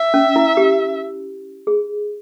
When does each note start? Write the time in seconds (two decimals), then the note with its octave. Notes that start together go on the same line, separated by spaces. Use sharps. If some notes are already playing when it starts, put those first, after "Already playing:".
Already playing: E5
0.14 C#4
0.36 E4
0.57 G4
1.67 G#4